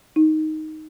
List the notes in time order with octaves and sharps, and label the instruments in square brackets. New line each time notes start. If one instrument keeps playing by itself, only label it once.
[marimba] D#4